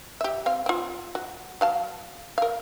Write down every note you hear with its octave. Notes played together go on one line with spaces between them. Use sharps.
G4 E5
C4 F5
C4 F4
F#4
F#3 F5 A5
A#4 F5